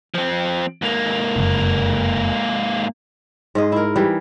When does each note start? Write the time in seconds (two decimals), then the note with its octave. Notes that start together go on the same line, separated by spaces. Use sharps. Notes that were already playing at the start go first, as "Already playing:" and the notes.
0.15 F3 C4
0.82 G#2 A#3
1.36 F1 F#2 C#3
3.55 G#2 G#3 D#5
3.72 E4 A#4
3.96 E3 G3